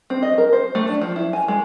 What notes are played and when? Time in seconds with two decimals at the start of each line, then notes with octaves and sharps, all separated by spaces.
0.10 C4
0.23 D#5
0.38 A#4
0.53 C5
0.75 A3
0.89 D4
1.02 F3
1.16 E4
1.33 G#5
1.48 G#3